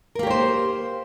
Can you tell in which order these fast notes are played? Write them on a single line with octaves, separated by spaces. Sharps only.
A#4 A#3 G4 C#5 C5